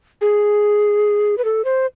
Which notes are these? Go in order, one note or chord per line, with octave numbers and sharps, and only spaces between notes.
G#4
B4
A4
C5